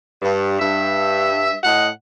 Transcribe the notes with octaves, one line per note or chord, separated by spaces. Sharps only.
G2
G2 E5
A2 D#5 F#5